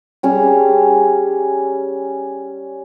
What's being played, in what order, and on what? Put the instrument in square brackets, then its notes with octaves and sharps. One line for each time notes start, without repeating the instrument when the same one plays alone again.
[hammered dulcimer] G3 C#4 G#4